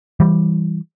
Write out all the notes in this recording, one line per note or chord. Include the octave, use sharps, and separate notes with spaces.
E3 G3